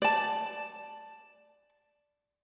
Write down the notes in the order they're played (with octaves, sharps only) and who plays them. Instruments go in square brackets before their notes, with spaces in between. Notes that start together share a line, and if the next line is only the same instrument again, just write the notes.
[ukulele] D5 A5